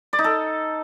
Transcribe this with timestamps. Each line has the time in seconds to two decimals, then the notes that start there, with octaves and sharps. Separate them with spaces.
0.13 D5
0.19 D#4
0.24 A4